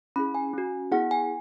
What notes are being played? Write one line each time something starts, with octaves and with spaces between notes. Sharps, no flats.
C#4 E4 G#4 B5
G#5
C#4 F#4
B3 E4 G#4 F#5
G#5